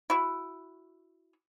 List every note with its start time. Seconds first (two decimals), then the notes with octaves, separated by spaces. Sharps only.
0.10 E4 F#4